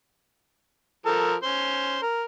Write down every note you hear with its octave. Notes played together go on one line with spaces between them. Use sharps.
F3 A4 A#4
C#4 C5
A#4